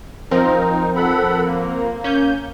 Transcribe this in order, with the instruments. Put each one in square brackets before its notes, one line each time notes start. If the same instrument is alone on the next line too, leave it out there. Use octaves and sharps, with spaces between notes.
[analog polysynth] F3 C4 A#4 [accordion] D#4
[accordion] A4 F#5 B5
A#3
[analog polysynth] C#4 G6